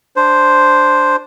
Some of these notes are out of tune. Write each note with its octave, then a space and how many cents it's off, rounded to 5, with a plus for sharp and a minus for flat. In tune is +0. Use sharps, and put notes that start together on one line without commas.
D4 +0 C5 +0